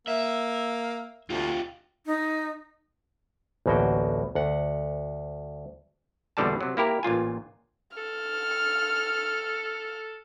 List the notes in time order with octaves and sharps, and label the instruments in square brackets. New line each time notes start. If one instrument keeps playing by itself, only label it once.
[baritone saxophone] A#3 [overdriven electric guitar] E5
[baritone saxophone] D2 [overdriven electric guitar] F4 G4
[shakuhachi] D#4
[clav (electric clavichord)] A1 D2 B2 A#3 F#4 G5
D2 F#5
A#1 E2 B2 D3 G3 A5
C3 F#3
A#3 E4 G4 A#4
A1 A#2 F4 G#5
[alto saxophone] A4 [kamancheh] F6